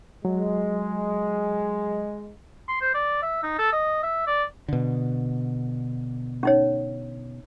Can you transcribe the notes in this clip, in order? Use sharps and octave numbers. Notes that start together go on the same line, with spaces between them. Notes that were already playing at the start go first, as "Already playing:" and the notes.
F#3 G#3
C6
C5
D5
E5
D#4
A4
D#5
E5
D5
B2 D3
C#4 D#4 C#5